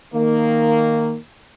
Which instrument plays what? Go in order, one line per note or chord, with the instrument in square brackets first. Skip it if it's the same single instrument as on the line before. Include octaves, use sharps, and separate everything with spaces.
[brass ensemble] D#3 A#3